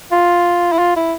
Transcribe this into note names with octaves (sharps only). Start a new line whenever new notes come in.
F4
E4
F4
E4